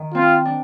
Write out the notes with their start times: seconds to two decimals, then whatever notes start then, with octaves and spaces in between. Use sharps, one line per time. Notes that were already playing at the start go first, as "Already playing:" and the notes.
Already playing: D#3
0.14 C4 F4
0.45 D4